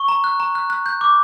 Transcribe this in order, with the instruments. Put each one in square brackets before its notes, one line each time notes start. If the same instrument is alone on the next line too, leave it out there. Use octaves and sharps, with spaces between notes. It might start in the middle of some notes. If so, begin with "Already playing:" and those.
Already playing: [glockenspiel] C#6
A#5
F#6
A#5
F#6
F#6
G6
D6